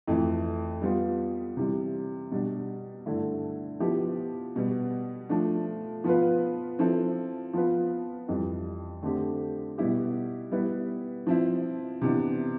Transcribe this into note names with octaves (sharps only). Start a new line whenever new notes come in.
F2 E3 A3
G3 B3 F4
C3 E3 G3
B2 G3 D4
G2 D3 A3 E4 A4
F3 B3 E4 G4
B2 G3 B3
F3 A3 D4
F3 B3 F4 B4
F3 C4 E4 A4
F3 B3 F4 B4
F2 E3 G3
D3 A3 C4 G4
B2 G3 B3 E4 G4
G3 B3 E4 B4
F3 C4 E4
C3 E3 B3 D4